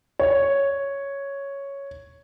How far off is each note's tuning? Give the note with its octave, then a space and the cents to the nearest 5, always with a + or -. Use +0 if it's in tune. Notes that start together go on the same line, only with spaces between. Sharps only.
C#5 +0